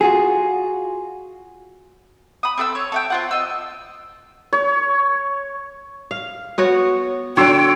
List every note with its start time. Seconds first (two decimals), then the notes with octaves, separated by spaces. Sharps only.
0.01 F4 F#4 G#4
2.43 B5 D#6
2.58 C4 A4 B5 E6
2.75 C#5
2.92 A4 E5 G5
3.10 C4 F4 F#5
3.31 D#5 E6
4.53 C#5
6.11 F5
6.58 B3 F#4 C#5
7.37 D3 F#3 C#5 G5 C6 E6